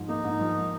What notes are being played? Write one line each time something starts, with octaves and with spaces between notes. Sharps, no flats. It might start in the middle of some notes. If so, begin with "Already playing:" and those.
Already playing: G#2 F3
A#3 D#4
G#2
F3